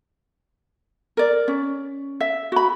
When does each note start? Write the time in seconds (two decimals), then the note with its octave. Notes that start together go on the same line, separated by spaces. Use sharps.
1.17 A#4 D5
1.48 C#4
2.20 E5
2.52 F#4 B5